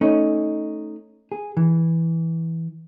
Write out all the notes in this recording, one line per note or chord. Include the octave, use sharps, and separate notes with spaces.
A3 C#4 D#4
G#4
E3